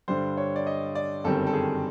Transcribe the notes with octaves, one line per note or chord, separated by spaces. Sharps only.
G2 D3 G3 C5
C#5
D5
D#5
D5
G1 F#2 D#3 G3 C4 A4
A4
G#4